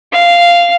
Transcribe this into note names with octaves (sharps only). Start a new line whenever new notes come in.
F5